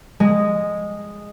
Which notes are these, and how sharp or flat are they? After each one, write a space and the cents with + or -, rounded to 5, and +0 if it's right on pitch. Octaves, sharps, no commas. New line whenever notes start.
G#3 -10